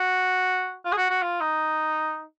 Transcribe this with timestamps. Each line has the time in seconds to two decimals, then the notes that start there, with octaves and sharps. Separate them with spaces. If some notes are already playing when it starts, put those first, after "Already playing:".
Already playing: F#4
0.85 F4
0.92 G#4
0.97 F#4
1.10 F#4
1.22 F4
1.40 D#4